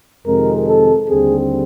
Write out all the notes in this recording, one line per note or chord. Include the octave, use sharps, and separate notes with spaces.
F2 C3 D#3 G#3 C4 A#4
A4
D#2 D3 G3 C4 G#4